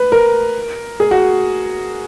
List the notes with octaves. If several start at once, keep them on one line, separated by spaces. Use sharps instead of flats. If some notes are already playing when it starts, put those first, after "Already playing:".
Already playing: B4
A#4
G#4
F#4